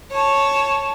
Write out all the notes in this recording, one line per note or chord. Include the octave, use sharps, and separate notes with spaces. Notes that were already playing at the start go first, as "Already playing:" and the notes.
C#5 A5